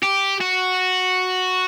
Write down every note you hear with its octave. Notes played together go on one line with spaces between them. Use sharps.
G4
F#4